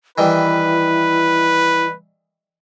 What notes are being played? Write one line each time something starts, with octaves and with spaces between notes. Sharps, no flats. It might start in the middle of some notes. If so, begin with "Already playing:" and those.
D#3 E3 G3 E4 B4